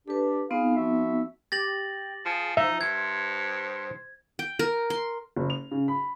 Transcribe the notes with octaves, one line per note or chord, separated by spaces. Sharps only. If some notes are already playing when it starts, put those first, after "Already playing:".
D4 G4 A4 B4
B3 C4 D#4 F4 G#4 F5
F3 F#4 E5
G4 A6 A#6 F#7
F3 G#4
F3 D#4 E5
G2 C5 G#6
G5
A#4
C6
F#1
F7
C#3
B5